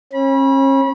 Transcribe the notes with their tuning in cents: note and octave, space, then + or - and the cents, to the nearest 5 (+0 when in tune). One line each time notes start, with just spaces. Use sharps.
C#4 -40 B5 -30